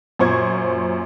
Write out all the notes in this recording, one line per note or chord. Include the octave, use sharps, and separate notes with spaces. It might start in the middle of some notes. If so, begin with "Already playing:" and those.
F#2 A#2 C5 C#6 G#6